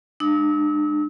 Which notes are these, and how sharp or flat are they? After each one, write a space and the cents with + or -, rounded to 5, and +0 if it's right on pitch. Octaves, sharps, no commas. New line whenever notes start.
G#3 +0 D4 +40 E6 -40